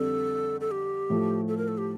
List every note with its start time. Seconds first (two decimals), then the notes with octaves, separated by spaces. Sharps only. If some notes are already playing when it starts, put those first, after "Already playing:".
Already playing: F2 D3 G3 A4
0.61 A4
0.71 G4
1.10 A2 F3 A3
1.48 A4
1.57 A#4
1.68 A4
1.78 G4